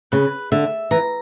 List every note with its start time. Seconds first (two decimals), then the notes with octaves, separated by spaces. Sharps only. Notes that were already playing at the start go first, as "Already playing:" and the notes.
0.12 C#3 B4
0.52 D3 E5
0.91 E3 A#5